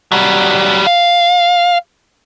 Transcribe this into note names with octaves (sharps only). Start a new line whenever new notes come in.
F#3 G3
F5